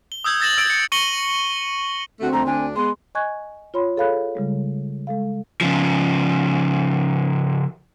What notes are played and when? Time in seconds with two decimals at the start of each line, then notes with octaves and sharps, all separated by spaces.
0.12 G7
0.24 D#6 E6 G6 G#6
0.40 E6 A6 A#6 E7 F#7
0.57 E6 G#6 A6 D7
0.70 C#7
0.92 C#6 A#6 C#7 D#7 F#7 G7
2.20 D3 A3 C4 F#4
2.33 F2 D3 A3 A#5
2.46 D2 D4 G#5
2.76 G#3 B3 C6
3.15 D#5 G#5 C#6 F#6 G#6
3.74 F4 C#5 B5 C6
3.97 G#4 A4 C#5 F5 B5 F#6
4.35 C#3 G3 G#3
5.07 G#3 A4 F5
5.61 C#3 F3